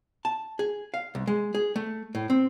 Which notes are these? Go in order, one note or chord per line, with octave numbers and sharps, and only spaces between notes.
A5
G#4
F5
C2
G#3
G#4
A3
A2
C4